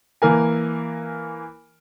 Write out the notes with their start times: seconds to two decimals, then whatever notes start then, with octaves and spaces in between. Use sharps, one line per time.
0.22 E3 A#3 A#4 G#5